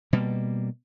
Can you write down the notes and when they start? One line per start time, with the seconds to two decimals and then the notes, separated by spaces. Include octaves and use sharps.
0.13 B2 G3 A#3